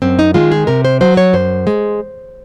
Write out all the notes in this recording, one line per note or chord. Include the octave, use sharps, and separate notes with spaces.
F#2 C4
D#4
D#3 G#3 F4
G#4
C3 A#4
C5
F#3 C5
C#5
F#2 C5
G#3